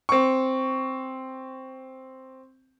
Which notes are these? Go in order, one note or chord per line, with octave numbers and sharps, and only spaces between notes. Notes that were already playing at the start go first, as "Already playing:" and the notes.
C4 C#6